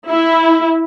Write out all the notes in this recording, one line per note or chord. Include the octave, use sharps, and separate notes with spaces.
E4